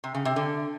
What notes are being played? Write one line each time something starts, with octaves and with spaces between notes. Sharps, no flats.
C3
C#3
C3
D3